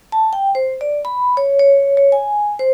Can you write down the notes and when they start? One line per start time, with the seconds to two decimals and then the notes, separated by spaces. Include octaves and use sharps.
0.12 A5
0.33 G5
0.55 C5
0.81 D5
1.05 B5
1.37 C#5
1.59 C#5
1.97 C#5
2.12 G#5
2.59 C5